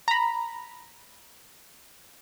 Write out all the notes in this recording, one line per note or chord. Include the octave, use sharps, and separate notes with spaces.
A#5 B5